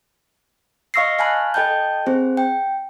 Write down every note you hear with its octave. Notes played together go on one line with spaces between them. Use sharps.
D#5 F5 C#6 E6 A#6 C7
F5 G#5 A5 B5 F#6
A4 D#5 G5 A5 G6
C4 G#4 C5
G5